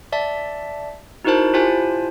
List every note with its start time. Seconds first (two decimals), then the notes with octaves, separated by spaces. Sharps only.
0.12 D5 E5 A5
1.25 D#4 E4 F#4 A#4 C5 A5
1.54 E4 F4 G4 C5 G#5 A5